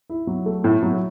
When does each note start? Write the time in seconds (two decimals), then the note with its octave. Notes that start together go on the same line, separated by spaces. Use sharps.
0.10 E4
0.27 F#3
0.46 A3
0.64 A2 E4
0.83 F#3